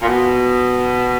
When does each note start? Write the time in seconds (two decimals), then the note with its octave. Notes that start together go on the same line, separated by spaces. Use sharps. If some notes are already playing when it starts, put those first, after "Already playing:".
0.02 A#2
0.07 B2